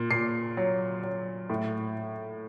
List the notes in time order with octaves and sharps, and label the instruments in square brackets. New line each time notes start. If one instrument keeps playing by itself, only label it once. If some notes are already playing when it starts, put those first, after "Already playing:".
Already playing: [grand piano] A#2
A#2 C7
F#3
F#3
A2